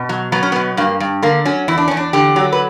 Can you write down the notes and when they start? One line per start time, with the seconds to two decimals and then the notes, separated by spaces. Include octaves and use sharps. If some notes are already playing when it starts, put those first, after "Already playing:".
Already playing: B2
0.09 F#3
0.32 F#3 B3
0.43 C#4
0.52 B2 B3
0.77 G2 A#3
1.00 G2
1.22 D3 A#3
1.45 F#3 C#4
1.68 E2 E4
1.77 D4
1.88 E2 C#4
1.97 D4
2.13 D3 G4
2.36 F#3
2.52 B4